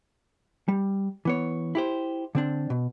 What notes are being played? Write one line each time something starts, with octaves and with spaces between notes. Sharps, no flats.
G3
E3 B3 C#5
E4 G4 C5
D3 C4 D4
B2